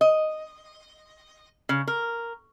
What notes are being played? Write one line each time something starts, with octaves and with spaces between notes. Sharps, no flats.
D#5
C#3
A#4